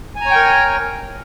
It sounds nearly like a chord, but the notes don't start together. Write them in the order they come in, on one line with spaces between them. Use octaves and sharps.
G#5 A#5 C#5 G5 A#4